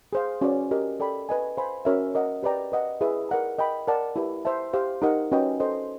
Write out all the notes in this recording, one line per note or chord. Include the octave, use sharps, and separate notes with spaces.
G#4 C5 F5
C#4 F#4 B4 D5
G4 A#4 D#5
A4 D5 G5 B5
B4 D#5 G#5
C5 F5 G#5 B5
C#4 F#4 A#4 C#5 E5
A#4 D#5 F#5
G4 B4 D5 G5 A#5
B4 D#5 F#5
E4 G#4 B4 E5
A#4 D5 F#5 A#5
A#4 D#5 G5 B5
A#4 D5 F#5 A5
E4 G4 B4
C5 E5 A5
G4 C5 F5
D#4 G4 A#4 D#5 F#5
C#4 F#4 B4 D#5 G5
A4 C5 D#5